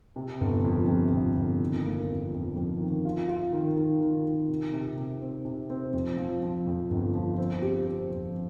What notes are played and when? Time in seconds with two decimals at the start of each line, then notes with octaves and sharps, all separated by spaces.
0.16 C3
0.41 G1
0.65 F2
0.88 C3
1.13 G1
1.37 G1
1.61 D#3
1.84 A#3
2.09 F2
2.33 F2
2.56 F2
2.80 D#3
3.05 F4
3.28 F4
3.53 D#3
3.76 D#3
4.01 D#3
4.26 D#3
4.49 C3
4.73 C3
4.98 C3
5.21 C4
5.45 C3
5.70 C4
5.93 F2
6.17 F3
6.43 F3
6.67 F2
6.90 G1
7.15 F3
7.38 C4
7.62 G4
7.87 C4
8.11 F2